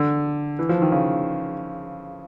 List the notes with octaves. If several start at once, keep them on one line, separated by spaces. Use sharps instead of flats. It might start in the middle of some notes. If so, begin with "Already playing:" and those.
Already playing: D3
E3
F3
D#3
C#3